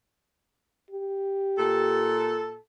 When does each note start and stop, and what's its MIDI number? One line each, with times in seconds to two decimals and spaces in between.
0.91 2.44 67
1.58 2.58 46
1.58 2.58 69